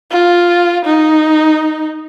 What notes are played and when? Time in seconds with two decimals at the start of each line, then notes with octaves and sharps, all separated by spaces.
0.11 F4
0.86 D#4